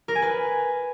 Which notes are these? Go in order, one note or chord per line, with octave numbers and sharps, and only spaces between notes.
A#4
G#5
B4